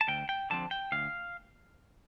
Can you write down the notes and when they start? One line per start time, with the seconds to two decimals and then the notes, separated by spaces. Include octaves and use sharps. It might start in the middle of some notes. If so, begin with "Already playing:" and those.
0.01 A5
0.08 D2 G5
0.29 G5
0.50 D3 F3 C4 A5
0.71 G5
0.92 D2 F5